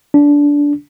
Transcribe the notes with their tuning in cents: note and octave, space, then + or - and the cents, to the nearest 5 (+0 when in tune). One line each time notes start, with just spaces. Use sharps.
D4 -20